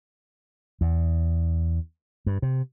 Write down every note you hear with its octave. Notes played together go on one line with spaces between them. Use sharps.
E2
G2
C3